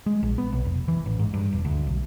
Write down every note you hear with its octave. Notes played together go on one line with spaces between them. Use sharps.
G#3
A#1
B3
B1
F1
E3
A1
G#2
G2
E1
D2
B1